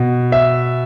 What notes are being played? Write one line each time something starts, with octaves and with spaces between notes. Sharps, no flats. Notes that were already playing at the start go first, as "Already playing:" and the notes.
Already playing: B2
E5